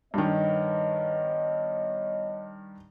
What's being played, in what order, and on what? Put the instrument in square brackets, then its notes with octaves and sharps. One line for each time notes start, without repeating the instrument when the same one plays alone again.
[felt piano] G2 D#3 [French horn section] B3 C#5 D#5